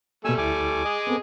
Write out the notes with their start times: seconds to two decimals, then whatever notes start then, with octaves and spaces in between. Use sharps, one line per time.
0.25 B2 G3 A3 A#3 G#5 E6
0.38 D2 E4 G#5 D6
0.85 G#4 D#5
1.07 B3 C4 A4